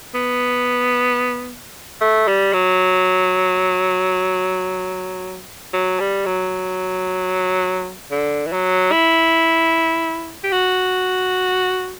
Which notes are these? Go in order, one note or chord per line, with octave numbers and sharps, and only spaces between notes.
B3
A3
G3
F#3
F#3
G3
F#3
D3
E3
F#3
E4
G4
F#4